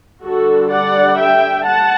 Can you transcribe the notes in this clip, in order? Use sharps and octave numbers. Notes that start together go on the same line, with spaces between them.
D3 G3 D4 F#4 A4
D5 F#5
E5 G5
F#5 A5